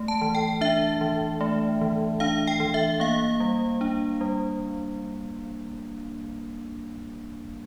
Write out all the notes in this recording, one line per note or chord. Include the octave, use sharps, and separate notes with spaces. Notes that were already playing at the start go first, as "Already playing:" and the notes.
Already playing: A3
A5
E3
G5
D4 E5
E3
A3
E3
D4 F5
G5
E3
E5
A#3 F5
G3
D4
G3